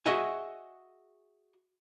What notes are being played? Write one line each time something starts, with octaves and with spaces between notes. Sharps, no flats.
F#4 G#4 D#5 E5 F#5 G#5